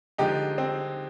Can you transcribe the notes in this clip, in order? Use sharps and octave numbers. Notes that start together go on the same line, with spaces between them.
D3 F3 G#3 D#4 G4
C4